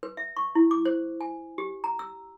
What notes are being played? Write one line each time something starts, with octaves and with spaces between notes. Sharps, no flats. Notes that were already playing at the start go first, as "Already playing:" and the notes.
B4
E5
C#6
E4
D6
C5
G#5
G4
A#5
E6